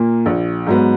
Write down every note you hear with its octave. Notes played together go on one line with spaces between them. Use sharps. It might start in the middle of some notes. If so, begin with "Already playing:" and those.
Already playing: A#2 A#3
A#1
G#2 F#3 B3